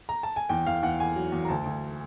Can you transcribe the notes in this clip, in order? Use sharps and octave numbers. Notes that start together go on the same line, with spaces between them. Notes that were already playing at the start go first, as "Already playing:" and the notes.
A#5
A5
G#5
E2 G5
E2 F5
E2 F#5
E2 G#5
F#3
E2
A#5
D2 A5
D2